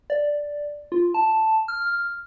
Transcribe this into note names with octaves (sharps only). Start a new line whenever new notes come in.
D5
F4
A5
F6